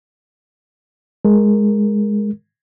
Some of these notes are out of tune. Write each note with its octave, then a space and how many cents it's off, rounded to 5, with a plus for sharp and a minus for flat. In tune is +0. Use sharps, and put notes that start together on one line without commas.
G#3 +0 A#4 +0